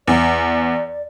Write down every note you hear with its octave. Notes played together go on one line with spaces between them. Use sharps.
E2 D5